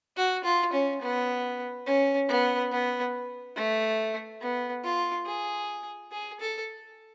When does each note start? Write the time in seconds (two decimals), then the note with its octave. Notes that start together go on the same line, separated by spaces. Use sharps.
0.17 F#4
0.44 F4
0.73 C#4
1.02 B3
1.86 C#4
2.29 B3
2.72 B3
3.56 A3
4.41 B3
4.84 F4
5.26 G#4
6.12 G#4
6.40 A4